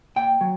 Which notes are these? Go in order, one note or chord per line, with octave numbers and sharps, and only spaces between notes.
A#2 G5
F#3